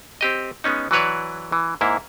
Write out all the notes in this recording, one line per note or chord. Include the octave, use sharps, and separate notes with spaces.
C4 G4 D#5
G#3 B3 C#4 D#4
E3 F#3 F#4 B4 C#5 D5
E3
G#2 A#3 E4